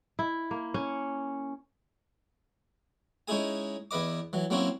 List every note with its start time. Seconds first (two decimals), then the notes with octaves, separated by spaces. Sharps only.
0.19 E4
0.51 A#3
0.74 C#4
3.28 G#3 C#4 D#4 E4 G#4 G#5
3.91 E2 E4 B4 D#5 D6
4.33 E3 F#3
4.50 F#3 A#3 C4 C#4 E4 F#4